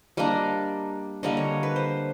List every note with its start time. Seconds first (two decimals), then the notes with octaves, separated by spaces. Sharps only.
0.17 G3 A#3 D4 D#5
1.23 D3 G3 A#3 D#5
1.37 C#5
1.63 B4
1.76 C5